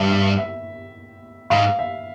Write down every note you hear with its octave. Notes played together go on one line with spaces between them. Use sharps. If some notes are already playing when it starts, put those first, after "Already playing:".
Already playing: G2 E5
E5
E5
G#2 F5
E5